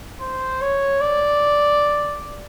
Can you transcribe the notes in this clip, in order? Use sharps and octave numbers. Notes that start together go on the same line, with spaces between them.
C5
C#5
D5